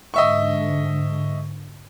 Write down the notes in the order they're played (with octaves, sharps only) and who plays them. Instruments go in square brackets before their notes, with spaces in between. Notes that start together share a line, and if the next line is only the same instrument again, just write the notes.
[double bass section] G#2 D3 [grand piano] D#5 E5 C#6